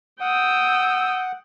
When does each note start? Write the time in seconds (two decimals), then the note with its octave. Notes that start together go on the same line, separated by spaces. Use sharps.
0.21 F#5 G5 D#6 E6